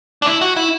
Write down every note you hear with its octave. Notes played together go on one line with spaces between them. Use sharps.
D4
E4
F#4
E4